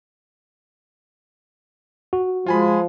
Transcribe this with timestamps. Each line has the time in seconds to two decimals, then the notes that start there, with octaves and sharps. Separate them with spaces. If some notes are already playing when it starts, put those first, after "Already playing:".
2.13 F#4
2.46 F3 G#3 F4 G#5 B5